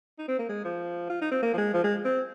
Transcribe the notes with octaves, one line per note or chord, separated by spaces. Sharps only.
D#4
C4
A#3
G#3
F3
F4
D#4
C4
A#3
F3
G#3
F3
G#3
C4